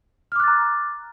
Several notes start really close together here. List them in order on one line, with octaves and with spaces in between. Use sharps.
F6 D6 F#6 A6 A#5